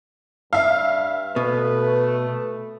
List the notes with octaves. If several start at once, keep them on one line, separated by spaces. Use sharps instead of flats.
G2 E5 F5
B2 A3 B4